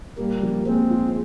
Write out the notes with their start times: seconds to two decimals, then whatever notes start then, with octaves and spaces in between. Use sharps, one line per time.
0.18 A#2 G3 A#3
0.43 F3
0.66 G#3 A#3 C4
0.90 F4